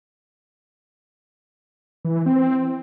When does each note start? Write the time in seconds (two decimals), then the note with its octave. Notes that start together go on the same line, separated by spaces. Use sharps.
2.05 E3
2.15 E3
2.26 C4